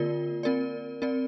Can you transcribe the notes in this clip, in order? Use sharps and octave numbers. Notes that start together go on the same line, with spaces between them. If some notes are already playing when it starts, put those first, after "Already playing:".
Already playing: D3 A#3 F4 A#4 D5
C4 A#4 D5
C4 A#4 D5